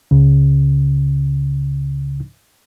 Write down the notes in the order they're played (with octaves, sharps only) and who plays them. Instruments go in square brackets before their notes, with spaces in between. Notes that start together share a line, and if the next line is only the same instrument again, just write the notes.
[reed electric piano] C#2 C#3